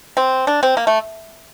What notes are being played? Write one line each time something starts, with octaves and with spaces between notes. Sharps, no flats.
C4
D4
C4
A#3
A3